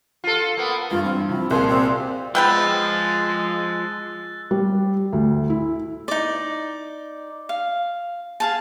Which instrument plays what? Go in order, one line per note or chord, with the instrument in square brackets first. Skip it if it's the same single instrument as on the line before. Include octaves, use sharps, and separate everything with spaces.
[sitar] F4 A4
A#3 B3
[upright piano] G2 E3 [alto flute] F4
[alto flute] C4
[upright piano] C3 F3 C4 [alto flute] E4
[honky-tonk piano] C2 A#2 G#4 [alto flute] C6
[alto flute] C4 [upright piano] F#4 D5
[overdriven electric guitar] F3 [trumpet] G#3 [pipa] B3 G5 B5 [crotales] E6 F#6 A6
[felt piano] G3
D2
E4
[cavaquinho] D#4 D5
F5
G#4 F5 A5